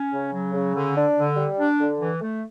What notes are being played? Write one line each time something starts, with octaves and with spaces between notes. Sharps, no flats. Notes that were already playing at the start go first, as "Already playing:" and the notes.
Already playing: C#4
C#3
F#3
C#3
D3
D4
D3
G3
D4
D3
E3
A3